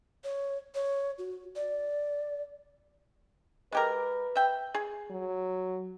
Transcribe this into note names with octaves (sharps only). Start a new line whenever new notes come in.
C#5
C#5
F#4
D5
G#3 G4 A#4 B4
E5 G5
G#4
F#3